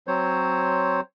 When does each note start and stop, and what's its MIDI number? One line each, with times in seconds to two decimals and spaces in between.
0.07 1.00 54
0.07 1.00 60
0.07 1.00 72
0.07 1.00 73